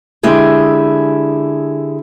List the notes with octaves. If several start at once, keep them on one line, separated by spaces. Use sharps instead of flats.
D3 G#3 E4 G4 G#4